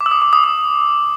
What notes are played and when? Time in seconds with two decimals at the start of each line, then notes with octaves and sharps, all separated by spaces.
0.01 D6
0.06 E6
0.11 D#6
0.22 D6
0.33 D#6
0.44 D#6